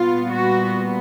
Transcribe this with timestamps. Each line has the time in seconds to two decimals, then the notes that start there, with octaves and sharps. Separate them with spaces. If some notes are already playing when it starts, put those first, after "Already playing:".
Already playing: A#2 G3 B3 F4
0.31 F#4